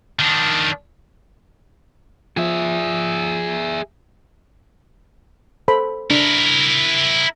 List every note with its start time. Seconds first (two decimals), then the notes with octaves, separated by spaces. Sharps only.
0.19 D#3 D4
2.37 F3 G#4 E5
5.68 A4 C5 B5
6.10 D4 E4 A#4